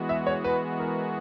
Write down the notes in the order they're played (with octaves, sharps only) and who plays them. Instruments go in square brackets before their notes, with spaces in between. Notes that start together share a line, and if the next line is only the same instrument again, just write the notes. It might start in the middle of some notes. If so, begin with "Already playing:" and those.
Already playing: [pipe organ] E3 G#3 B3 F#4
[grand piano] E5
C#5
B4
A#4